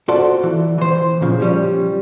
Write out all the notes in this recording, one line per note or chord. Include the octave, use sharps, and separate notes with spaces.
F4 F#4 A4 C5 D5 A5
E3
E3 C5
A#2 C#3 F3
F3 G3 C#4